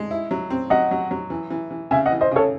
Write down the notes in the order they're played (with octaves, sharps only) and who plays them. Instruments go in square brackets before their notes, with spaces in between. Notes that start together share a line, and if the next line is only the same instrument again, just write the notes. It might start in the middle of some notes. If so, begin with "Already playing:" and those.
Already playing: [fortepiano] G#3
E4
F#3
C4
[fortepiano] F#3 [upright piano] D#5 F#5
[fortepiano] F#3
F#3
E3
E3
E3
[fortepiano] C#3 [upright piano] E5 G#5
[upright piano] D#5 F#5
[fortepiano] E3
[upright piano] C5 D#5
[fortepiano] C#3 [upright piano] A4 C#5